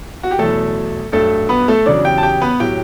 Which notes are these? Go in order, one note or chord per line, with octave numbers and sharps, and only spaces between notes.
F#4
G4
E2 B2 F#3 A3 A4
G2 F#3 A3 A4
B3 B4
A3 A4
E2 C#3 F#3 D4 D5
G4 G5
A5
G4 G5
B3 B4
A2 F#3 G4 G5